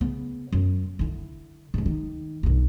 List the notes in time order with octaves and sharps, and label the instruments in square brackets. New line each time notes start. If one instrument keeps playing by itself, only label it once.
[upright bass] C#3 B3
F#2
D3 E4
C#2 G#2
D#3
B1 G2